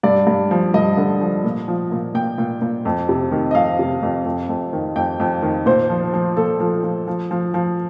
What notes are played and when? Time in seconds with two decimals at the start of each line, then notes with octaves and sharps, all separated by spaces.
0.03 G2 D5
0.27 G2
0.51 F3
0.74 G2 D#5
0.97 D3
1.21 F3
1.44 A#2
1.68 F3
1.92 A#2
2.14 A#2 G5
2.38 A#2
2.62 A#2
2.85 F2
3.09 C3
3.32 D#3
3.51 D#5
3.55 F2 F5
3.79 C3
4.02 F2
4.25 F2
4.49 F2
4.73 D#3
4.96 F2 G5
5.20 F2
5.42 D#3
5.66 A#2 C5
5.89 F3
6.13 F3
6.37 A#2 A4
6.60 F3
6.84 F3
7.07 F3
7.31 F3
7.54 F3